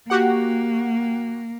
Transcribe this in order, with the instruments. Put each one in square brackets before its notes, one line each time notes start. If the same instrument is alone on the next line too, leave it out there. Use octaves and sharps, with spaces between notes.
[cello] A#3 [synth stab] F#4 G4 F#5